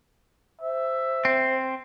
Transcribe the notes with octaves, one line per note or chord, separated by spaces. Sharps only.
C5 E5
C4